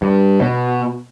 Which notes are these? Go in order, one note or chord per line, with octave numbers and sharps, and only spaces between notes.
G2
B2